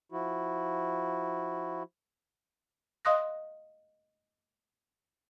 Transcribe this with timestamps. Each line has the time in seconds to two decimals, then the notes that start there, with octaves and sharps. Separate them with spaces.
0.12 F3 E4 F#4
3.05 D#5 F5 C6 D#6 F#6 A#6